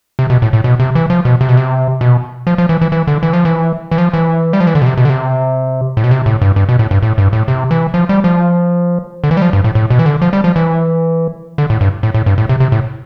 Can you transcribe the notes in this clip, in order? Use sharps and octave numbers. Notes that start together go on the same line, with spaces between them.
C3
B2
A2
A2
B2
C3
E3
F3
B2
C3
B2
C3
B2
F3
F3
E3
E3
E3
D3
E3
F3
E3
E3
F3
E3
G3
F3
E3
D3
B2
C3
B2
D3
C3
A2
B2
C3
A2
G2
G2
B2
A2
G2
A2
G2
A2
C3
E3
F3
G3
F3
D3
E3
G3
F3
G2
A2
A2
B2
E3
D3
F3
G3
F3
E3
D3
A2
G2
A2
A2
G2
A2
C3
C3
A2